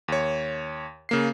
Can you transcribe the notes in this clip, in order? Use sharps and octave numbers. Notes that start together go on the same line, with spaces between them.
D#2 C#5
C#3 A#3 C7